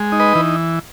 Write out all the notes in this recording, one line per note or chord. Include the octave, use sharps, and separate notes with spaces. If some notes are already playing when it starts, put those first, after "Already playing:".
Already playing: G#3
D#4
B4 D#5
E3